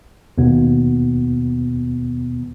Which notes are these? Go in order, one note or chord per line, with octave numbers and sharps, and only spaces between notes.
D#2 B2 B3